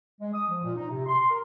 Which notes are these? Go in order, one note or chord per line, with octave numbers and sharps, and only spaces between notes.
G#3
D#6
F3
A#2
D#4
C3
C6
A#4